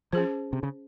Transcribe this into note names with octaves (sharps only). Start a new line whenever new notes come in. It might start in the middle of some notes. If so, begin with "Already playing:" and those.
F3 C#4 G#4 C5
C3
C#3